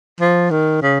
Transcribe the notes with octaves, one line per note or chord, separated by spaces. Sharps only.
F3
D#3
C#3